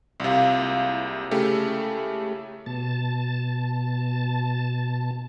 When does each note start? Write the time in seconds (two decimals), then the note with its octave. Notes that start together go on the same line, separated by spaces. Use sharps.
0.20 C2 C3 F4
0.58 G#3 A#3 E4
1.31 C#3 A3 E4 G4
2.66 B2 A5